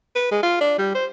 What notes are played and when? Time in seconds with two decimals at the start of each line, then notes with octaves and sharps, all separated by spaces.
0.15 B4
0.31 G#3
0.43 F4
0.61 D4
0.78 G3
0.95 C5